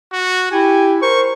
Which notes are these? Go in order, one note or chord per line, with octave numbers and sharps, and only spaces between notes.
F#4
E4 G4 G#5
A#4 C5 C#6